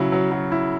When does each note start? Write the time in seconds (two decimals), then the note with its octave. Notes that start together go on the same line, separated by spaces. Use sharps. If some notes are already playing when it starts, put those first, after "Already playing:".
Already playing: C#3 F#3 E4
0.12 F#3
0.31 F#3
0.52 E4